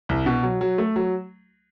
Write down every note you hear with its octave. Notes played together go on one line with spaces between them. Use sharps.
C2
B2
F#3
F#3
A3
F#3